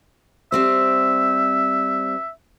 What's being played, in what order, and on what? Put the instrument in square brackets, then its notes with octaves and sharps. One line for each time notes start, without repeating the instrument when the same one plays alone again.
[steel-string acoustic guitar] G3 C4 C5 [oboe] E5